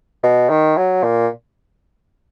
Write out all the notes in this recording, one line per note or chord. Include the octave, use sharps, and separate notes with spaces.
B2
D#3
F#3
A#2